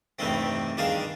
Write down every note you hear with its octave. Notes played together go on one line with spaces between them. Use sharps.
E2 G2 C3 D#3 A3 C4
G2 D#3 D4 G#4 F5 A5